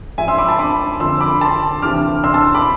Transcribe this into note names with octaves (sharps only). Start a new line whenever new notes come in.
G#2 F3 E5 G#5
C6 E6
B5 D6
A5 C6
B5 D6
F2 D3 F3 C6 E6
B5 D6
A5 C6
D2 C3 E3 D6 F6
C6 E6
A5 C6
B5 D6